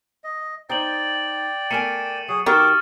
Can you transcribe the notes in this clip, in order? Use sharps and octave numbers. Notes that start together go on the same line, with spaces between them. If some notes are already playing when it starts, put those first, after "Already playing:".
D#5
D#4 C5 D5 G5 A6 F#7
A3 A#4 G#5 C#7 D#7 E7
F#3 G#4
D#3 F#4 G4 D6 D#6 F6 A6